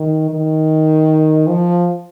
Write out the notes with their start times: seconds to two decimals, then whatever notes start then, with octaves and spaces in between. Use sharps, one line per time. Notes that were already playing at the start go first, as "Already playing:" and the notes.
Already playing: D#3
0.30 D#3
1.47 F3